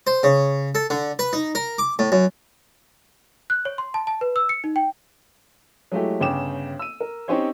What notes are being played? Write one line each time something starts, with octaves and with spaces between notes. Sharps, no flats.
C5
C#3
A4
D3
B4
D#4
A#4
D6
A2
F#2
F#6
C#5
C6
A5
A5
B4
E6
C#7
D#4
G5
F#3 G#3 A3 E4 G4
G1 C#3 G5 D6 E7
E6 D#7
A#4
C4 C#4 D#4 G4 C5 C#5